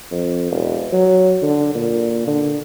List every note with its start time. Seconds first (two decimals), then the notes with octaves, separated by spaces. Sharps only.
0.12 F2
0.52 E1
0.93 F#3
1.42 D3
1.75 A#2
2.27 D3